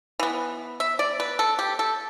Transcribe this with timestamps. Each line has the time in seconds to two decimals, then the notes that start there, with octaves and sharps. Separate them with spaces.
0.19 E3 B3
0.80 E5
0.99 D5
1.20 B4
1.39 A4
1.59 G4
1.79 A4